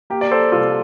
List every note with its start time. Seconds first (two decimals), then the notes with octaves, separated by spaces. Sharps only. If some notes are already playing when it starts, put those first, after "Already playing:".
0.10 A#3 G4
0.21 D5
0.31 A4 C5
0.52 C2 F4 A4